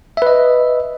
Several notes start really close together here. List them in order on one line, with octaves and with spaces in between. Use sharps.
E5 B4 D#5